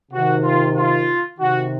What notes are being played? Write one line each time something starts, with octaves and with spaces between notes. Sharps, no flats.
C3 D#3 F#4
F4
F4
C3 D#3 F#4